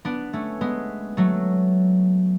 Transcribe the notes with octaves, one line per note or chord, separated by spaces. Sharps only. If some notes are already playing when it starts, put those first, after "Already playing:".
B3 D4
A3 C#4
G#3 B3
F#3 A3